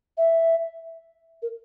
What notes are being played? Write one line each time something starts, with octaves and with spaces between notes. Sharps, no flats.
E5
A#4